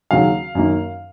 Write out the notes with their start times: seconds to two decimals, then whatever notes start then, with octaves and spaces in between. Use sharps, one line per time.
0.11 D#2 C#3 F#3 F5
0.55 F#2 D#3 A#3